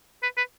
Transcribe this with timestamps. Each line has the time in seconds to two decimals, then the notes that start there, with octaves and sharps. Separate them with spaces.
0.23 B4
0.37 B4